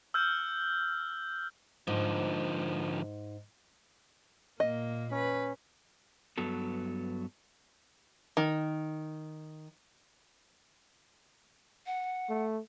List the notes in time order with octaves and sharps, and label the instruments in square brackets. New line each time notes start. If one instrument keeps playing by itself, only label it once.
[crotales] E6 F6 G6
[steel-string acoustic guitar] G#2 [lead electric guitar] D3 F3
[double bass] A#2 [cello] A#3 [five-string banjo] D#5
[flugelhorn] C#4 [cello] B4
[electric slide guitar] G2 F#3 B3 A4
[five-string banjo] D#3
[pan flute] F#5
[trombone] A3